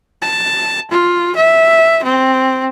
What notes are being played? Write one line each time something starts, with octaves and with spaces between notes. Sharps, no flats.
A5
F4
E5
C4